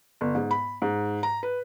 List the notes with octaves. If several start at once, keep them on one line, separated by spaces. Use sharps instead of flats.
G1
G#2
B5
G#2
A#5
B4